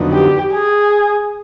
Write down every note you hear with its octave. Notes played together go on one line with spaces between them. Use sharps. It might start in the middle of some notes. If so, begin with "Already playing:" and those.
Already playing: F2 D3 F#3 B3 D#4
G4
G#4